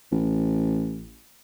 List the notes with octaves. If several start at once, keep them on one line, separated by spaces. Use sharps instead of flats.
A1